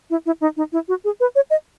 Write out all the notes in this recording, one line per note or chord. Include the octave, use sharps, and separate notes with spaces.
E4
E4
D#4
D#4
E4
F#4
G#4
B4
C#5
D#5